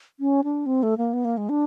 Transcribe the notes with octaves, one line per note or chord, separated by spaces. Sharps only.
C#4
D4
C4
A3
A#3
B3
A#3
G#3
D4